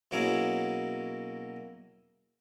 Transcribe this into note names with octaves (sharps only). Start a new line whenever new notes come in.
B2 F#3 A#3 C#4 E4 G#4